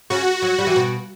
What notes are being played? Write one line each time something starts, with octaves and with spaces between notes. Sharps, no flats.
C#3 F#4
F#3
G3
E3
B2